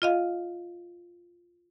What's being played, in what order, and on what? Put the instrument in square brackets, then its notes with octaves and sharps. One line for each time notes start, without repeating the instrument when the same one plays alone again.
[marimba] F4 D#5 F5